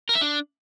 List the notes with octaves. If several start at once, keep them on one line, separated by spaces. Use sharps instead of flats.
A#4
E5
D4